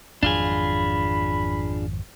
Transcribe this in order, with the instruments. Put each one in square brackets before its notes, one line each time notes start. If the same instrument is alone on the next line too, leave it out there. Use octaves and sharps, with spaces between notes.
[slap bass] G#1 F2 F#3 [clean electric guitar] D4 F4 G#4 [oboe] B5